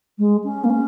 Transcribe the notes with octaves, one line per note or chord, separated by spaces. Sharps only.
G#3
C#4
A#3
C#4